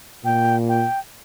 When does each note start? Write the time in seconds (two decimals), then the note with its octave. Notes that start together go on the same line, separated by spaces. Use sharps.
0.24 A#2 G5
0.69 G5